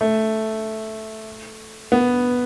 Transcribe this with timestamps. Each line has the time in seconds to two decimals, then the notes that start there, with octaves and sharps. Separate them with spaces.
0.01 A3
1.92 B3